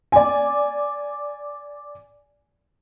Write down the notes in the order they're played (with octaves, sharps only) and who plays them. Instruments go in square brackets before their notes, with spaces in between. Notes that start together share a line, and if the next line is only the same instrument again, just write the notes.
[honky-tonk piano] D5 G#5